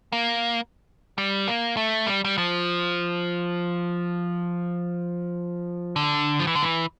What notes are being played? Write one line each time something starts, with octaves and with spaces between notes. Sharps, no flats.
A#3
G3
A#3
A3
G3
G3
F3
D3
F3
E3
D3
E3